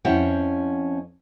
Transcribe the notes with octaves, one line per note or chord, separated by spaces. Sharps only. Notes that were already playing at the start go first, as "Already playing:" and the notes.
F2 C4 C#4 E4 F#5 G5